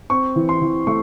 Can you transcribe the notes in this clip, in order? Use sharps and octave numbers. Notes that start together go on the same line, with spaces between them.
C4 C#6
E3
C6
E3
A3 C#6